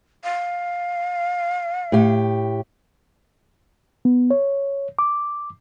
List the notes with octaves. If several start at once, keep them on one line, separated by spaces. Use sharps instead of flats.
F5
A2 G4
B3
C#5
D6